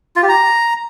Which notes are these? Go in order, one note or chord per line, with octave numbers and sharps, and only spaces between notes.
F4
G4
A#5